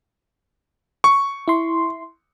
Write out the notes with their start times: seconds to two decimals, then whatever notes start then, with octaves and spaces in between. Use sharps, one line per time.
1.04 C#6
1.48 E4 C6